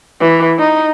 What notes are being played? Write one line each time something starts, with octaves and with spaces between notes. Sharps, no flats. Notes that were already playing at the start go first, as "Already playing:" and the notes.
E3
D#4